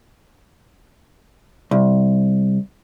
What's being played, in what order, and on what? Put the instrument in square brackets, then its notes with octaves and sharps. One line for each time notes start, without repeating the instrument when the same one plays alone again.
[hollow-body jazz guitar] C2